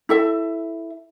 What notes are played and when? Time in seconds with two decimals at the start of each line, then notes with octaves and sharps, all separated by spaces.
0.09 E4 A4 E5